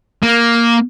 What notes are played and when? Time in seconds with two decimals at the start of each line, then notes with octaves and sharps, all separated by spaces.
0.23 A#3